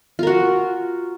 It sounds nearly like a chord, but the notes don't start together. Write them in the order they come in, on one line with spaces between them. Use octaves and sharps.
F4 A#4 F#4